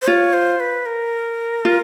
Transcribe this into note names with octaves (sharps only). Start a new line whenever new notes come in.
C5
F4 C#5
C5
B4
A#4
F4